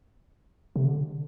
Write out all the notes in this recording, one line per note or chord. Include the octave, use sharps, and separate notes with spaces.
C3
D3